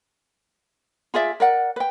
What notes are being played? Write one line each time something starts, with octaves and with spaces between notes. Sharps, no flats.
F4 G#4 D5 E5
A#4 D5 F#5
B4 G5